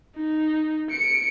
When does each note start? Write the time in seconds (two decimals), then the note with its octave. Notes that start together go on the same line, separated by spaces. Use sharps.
0.16 D#4
0.91 C#7 D7